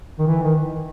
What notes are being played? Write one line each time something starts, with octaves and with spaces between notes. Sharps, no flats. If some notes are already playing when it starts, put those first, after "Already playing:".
D#3
E3
D#3